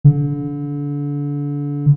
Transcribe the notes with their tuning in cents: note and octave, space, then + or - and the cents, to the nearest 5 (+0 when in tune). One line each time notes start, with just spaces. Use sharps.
D3 -30